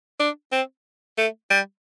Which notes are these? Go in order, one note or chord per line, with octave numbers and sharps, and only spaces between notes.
D4
C4
A3
G3